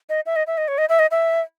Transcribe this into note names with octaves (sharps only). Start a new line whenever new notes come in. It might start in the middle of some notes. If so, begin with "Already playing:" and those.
D#5
E5
D#5
E5
D#5
C#5
D#5
E5
D#5
E5